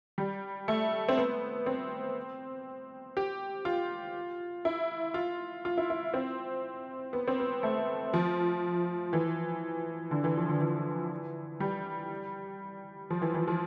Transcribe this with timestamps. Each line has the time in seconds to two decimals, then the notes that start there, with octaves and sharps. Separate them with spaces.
0.18 G3
0.68 A3
1.09 C4
1.18 B3
1.66 C4
3.17 G4
3.65 F4
4.65 E4
5.14 F4
5.65 F4
5.78 E4
5.90 E4
6.14 C4
7.13 B3
7.28 C4
7.40 B3
7.63 A3
8.14 F3
9.13 E3
10.11 D3
10.24 E3
10.37 F3
10.49 D3
10.61 E3
11.60 G3
13.10 F3
13.22 E3
13.34 E3
13.48 F3